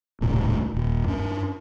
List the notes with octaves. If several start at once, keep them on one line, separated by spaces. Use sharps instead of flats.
D#1 C2 A2 C#3
D#1
G2 C#4